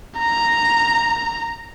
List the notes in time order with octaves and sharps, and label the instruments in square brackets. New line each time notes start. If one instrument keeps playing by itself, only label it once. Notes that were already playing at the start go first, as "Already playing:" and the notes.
[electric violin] A#5